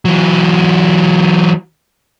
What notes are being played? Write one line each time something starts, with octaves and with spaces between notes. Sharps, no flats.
E3 F#3